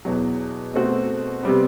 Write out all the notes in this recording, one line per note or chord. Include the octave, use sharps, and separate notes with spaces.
E2 B2 F#3
B2 A3 C4 F#4
C3 G3 B3